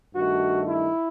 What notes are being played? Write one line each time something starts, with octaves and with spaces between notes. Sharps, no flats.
G2 D#3 A3 F#4
E4